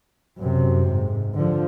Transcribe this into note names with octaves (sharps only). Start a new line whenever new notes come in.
F#2 C3
G#2
D3 F3